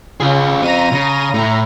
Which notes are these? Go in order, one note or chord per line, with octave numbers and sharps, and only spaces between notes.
C#3 F4 G#4
C4 F4 A#5 A#6 D#7
C#3
A2 A#5